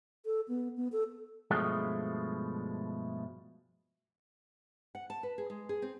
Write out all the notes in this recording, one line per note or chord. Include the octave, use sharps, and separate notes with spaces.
A4
B3
B3
A4
G2 B2 F3 G#3 A3
F#5
A5
B4
G#4
G#3
G#4
C4